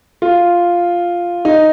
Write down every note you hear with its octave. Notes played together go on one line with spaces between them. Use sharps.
F4
D#4